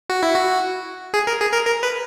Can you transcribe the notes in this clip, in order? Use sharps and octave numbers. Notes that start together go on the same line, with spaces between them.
F#4
E4
F#4
G#4
A#4
G#4
A#4
A#4
B4